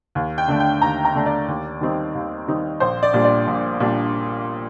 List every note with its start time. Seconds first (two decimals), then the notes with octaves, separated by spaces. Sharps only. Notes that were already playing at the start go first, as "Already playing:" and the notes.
0.15 D#2
0.38 G5
0.48 D3 A3 D4
0.60 G5
0.81 D#2 A#5
1.05 A#5
1.15 D3 A3 D4
1.26 D5
1.48 D#2
1.81 D#3 G3 C4 D#4
2.15 D#2
2.48 D#3 G3 C4 D#4
2.80 A#1 C5
3.03 D5
3.14 A#2 G3 D4
3.25 D5
3.47 A#1
3.80 A#2 G3 D4